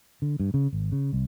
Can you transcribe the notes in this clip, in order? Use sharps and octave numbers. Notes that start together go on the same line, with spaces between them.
D3
G2
C#3
G#1
C#3
C2